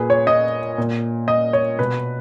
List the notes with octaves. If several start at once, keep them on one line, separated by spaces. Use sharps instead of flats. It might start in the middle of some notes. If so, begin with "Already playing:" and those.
Already playing: A#2 G#4 B4
C#5
D#5
A#2
D#5
C#5
B2 B4